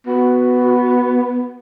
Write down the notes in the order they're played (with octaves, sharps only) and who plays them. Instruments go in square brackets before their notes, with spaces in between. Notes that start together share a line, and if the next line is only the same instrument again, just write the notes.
[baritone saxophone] B3 [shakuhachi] F#4